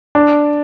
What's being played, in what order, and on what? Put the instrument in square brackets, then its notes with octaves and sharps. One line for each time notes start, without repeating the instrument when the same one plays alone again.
[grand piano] D4